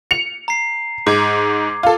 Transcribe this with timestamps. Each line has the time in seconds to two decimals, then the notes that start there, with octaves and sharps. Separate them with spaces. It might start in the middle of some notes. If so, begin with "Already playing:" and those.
0.11 C#7 F7
0.48 A#5 C7
1.07 G#2 D6 G#6
1.83 F4 A4